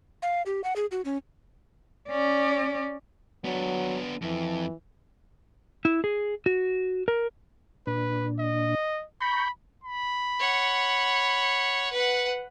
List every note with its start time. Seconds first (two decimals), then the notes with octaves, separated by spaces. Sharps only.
0.22 F5
0.46 G4
0.64 F#5
0.76 G#4
0.92 F#4
1.05 C#4
2.09 C#4 D5
3.45 F#3 B3 D4
4.22 F2 E3
5.85 E4
6.04 G#4
6.46 F#4
7.08 A#4
7.87 A#2 D4 B4
8.39 D#5
9.21 A#5 B5 C#6 G6
9.84 B5
10.40 C#5 F#5
11.93 B4 F#5